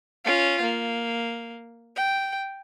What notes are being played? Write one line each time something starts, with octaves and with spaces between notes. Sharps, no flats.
C#4 F4
A#3
G5